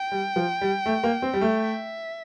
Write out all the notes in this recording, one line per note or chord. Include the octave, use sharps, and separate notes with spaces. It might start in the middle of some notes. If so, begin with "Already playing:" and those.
Already playing: G5
G3
F3
G3
A3
A#3
C4
G3
A3
E5